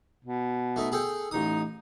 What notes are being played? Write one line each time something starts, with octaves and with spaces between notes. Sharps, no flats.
B2
A3 D#4
G#4 A4 G5
A1 D#4 D#6